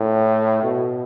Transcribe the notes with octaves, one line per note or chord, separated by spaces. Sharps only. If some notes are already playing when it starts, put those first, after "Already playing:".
Already playing: A2
B2